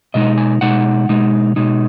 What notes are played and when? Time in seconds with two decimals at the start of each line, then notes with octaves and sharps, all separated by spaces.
0.14 B2 G#3 D#4 D#5
0.38 G#5
0.61 B2 G#3 D#4 F#5
1.09 B2 G#3 D#4
1.56 B2 G#3 D#4